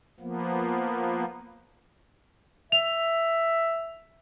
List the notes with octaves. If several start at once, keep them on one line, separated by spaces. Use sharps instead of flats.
F3 A#3 B3
E5 F7